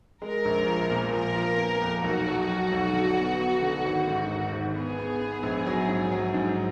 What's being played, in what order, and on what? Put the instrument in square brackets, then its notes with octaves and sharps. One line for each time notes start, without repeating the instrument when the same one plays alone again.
[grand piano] G#3 [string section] A#4
[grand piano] A#1
F3
A#2
[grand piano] F3 [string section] A#4
[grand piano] F3
A#3
F2
[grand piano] B1 [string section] F#4
[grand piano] F#3
F#3
B1
D3
B3
B3
D3
G#1
G#2
G#1
G#1
[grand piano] B3 [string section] G#4
[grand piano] B3
B3
A#1
F#3
G#2
F#3
G#2